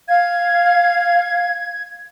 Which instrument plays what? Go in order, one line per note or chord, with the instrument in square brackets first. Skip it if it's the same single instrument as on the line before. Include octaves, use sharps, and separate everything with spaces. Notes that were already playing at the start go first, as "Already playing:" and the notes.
[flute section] F5 [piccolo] G#6